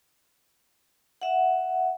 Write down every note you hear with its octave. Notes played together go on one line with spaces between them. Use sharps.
E5 F#5